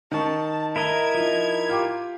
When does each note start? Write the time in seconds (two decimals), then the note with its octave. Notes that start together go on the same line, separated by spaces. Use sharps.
0.12 D#3 A5 C#6
0.76 E4 A#4 D#5 G#6
1.14 F3 D#4
1.69 F4 G4 D6